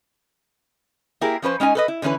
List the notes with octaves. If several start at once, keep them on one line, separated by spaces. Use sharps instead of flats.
A#3 E4 G4 G#4 A#4
F3 C#4 B4 C5
G#3 C#4 D#4 G#5
A4 B4 D#5
E4
D3 E3 C#4 E4 B4